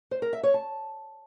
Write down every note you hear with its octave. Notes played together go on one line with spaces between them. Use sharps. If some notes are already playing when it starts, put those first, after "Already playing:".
C5
A#4
E5
C#5
A5